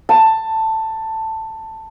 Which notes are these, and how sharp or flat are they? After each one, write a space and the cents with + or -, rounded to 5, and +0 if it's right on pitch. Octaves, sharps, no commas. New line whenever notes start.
A5 +10